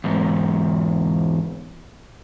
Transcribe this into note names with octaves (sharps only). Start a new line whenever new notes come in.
E2 G#2